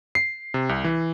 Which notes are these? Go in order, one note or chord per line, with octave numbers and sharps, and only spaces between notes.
C7
C3
C2
E3